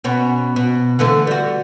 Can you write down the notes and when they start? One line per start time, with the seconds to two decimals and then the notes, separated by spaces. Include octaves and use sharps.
0.04 B2 B3 C#4
0.56 B2
0.99 D3 E3 A3
1.27 G3 F#4